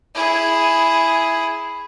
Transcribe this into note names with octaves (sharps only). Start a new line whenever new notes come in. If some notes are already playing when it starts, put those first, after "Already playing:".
E4 G#4